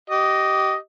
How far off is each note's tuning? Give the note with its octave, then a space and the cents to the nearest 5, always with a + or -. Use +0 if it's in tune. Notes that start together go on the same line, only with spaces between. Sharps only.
G4 -25 D#5 +0